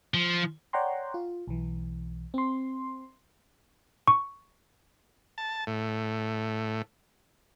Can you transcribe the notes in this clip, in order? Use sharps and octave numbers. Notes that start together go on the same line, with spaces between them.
F3
C#5 D5 F#5 G5 A#5 C6
F4
B1 E3
C4 C6
C#6
A5
A2